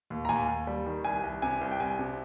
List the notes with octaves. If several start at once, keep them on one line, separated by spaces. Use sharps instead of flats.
D#2
A#5
D#2 G#5
D#2
G3
D#3
C2 G#5
C2
C3 G#5
C2
G5
C2 G#5
C3